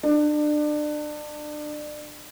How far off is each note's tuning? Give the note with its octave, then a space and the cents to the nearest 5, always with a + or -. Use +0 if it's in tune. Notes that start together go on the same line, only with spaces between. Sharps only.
D4 +30